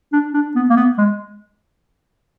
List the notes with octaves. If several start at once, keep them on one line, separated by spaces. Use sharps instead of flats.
D4
D4
B3
A#3
B3
G#3